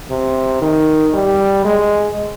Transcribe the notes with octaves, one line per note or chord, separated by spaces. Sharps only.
C3
D#3
G3
G#3